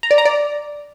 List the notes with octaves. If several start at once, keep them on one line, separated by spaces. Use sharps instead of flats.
A#5
D5
A#5
D5